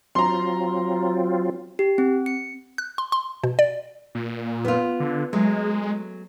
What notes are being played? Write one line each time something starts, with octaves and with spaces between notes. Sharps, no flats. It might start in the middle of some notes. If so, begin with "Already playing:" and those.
F#3 C4 F4 A#5 C6
G4
C4
C#7
F#6
C6
C6
B2
D5
A#2
B3 F4
D3
F#3 G#3 A3